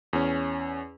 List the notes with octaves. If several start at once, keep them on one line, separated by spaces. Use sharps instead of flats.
E2 C#4